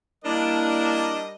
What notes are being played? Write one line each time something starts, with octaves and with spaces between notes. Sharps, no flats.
G3 A#3 D4 E4 A#4 D#5